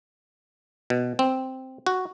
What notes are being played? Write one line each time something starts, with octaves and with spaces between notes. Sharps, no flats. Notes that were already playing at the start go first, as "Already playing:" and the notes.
B2
C4
F#4